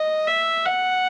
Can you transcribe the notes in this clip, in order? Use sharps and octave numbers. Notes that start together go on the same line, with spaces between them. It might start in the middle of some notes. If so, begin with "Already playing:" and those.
Already playing: D#5
E5
F#5